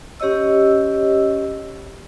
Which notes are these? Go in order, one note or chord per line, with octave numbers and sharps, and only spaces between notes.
C#4 G4 C#5 D#5 E6